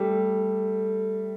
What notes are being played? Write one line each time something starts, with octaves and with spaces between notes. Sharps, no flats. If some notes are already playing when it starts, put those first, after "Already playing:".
Already playing: G3 A3